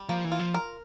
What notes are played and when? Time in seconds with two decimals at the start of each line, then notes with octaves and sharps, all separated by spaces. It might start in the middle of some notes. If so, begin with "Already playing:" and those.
Already playing: G3
0.09 F3 A#3
0.25 E3
0.32 F4
0.39 F3
0.54 A#4